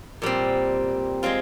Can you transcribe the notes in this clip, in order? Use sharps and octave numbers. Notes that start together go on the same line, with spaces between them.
A#2 G3 C4
G#3 C4 F4